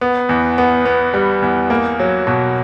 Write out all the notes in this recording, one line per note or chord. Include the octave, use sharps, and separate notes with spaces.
B3
E2
B3
B3
G3
E2
A#3
F#3
B2